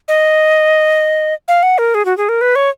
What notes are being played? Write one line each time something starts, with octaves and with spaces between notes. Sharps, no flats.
D#5
F5
F#5
A#4
G#4
F#4
G#4
A#4
B4
C#5